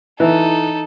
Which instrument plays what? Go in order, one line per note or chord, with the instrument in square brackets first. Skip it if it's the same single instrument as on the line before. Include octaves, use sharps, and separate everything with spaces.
[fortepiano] E3 [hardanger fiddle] D#4 A4